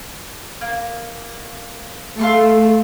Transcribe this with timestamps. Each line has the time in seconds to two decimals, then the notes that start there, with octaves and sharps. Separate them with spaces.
0.61 A#3
2.19 A3 F5 C6 C#6